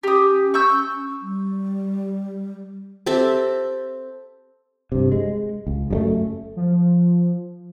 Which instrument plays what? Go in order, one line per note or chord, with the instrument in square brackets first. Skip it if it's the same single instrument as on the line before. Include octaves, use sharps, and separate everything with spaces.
[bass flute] C#4 [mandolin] G4 D#6
[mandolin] C#6 E6 G6
[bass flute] G3
[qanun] C4 G4 A4 E5
[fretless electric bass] G2 C3
G#3
C#2
F#2 G3 A3
[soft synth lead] F3